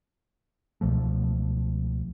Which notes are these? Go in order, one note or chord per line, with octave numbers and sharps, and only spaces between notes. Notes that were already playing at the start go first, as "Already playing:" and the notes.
C#2 B2 F3 A3